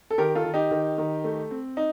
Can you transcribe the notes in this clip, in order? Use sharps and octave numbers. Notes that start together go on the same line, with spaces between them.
A4
D#3 G4 A#4
F4 A4
D#3
D#4 G4
D#3
D#3
A3
C4
D#4